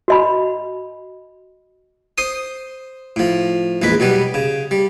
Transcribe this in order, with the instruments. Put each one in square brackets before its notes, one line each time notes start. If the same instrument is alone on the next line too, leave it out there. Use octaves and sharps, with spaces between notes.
[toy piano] F#4 D#5 B5
[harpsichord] C5 C6 D#6
A2 F3
A#1 E2 G#3 B4 B5
B2 F#3 G3 B3
C#3
G3